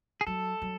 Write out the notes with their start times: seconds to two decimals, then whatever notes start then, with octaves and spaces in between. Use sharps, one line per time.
0.21 G#4
0.27 F#3 A4
0.62 F#3